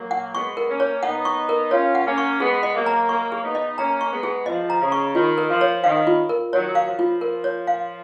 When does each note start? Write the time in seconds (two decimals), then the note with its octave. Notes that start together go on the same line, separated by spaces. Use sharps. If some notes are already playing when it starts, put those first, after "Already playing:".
Already playing: F#3 A#3
0.11 F#5
0.34 G#3 B3 C#6
0.57 A#4
0.69 A#3 C#4
0.80 C#5
1.03 B3 D#4 F#5
1.25 C#6
1.49 A#4
1.71 C#4 F4 C#5
1.95 F#5
2.06 A#3 C#4
2.18 C#6
2.40 G#3 B3 G#4
2.63 D#5
2.75 F#3 A#3
2.86 A#5
3.08 F#3 A#3 C#6
3.32 G#4
3.43 B3 D#4
3.55 D#5
3.78 A#3 C#4 A#5
4.01 C#6
4.12 G#3 B3
4.23 G#4
4.46 F3 D#5
4.70 A#5
4.81 C#3
4.92 C#6
5.15 D#3 F4
5.38 A#4
5.50 F3
5.61 C#5
5.84 D#3 F5
6.07 F4
6.29 A#4
6.53 D#3 F#3 C#5
6.75 F5
6.87 F3
6.99 F4
7.21 A#4
7.44 C#5
7.67 F5